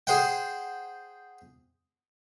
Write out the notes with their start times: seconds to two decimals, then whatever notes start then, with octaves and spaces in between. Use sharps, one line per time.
0.07 G#4 C5 F#5 G5